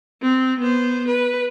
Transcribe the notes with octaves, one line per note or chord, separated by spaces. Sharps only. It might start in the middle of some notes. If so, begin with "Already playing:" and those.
C4
B3 C5
B4